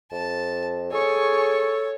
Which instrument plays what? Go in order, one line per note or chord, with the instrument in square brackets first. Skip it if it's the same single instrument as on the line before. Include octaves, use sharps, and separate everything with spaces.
[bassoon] F2 [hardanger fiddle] A5
[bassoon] G#4 [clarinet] A4 [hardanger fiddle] C#5 [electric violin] G#5 C#6